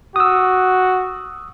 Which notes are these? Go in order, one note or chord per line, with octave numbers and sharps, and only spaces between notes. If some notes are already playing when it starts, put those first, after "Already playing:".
F#4 D#6 E6